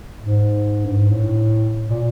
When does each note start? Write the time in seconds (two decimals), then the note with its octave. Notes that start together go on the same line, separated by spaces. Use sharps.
0.22 G#2
0.85 G2
0.98 G#2
1.10 A2
1.89 A#2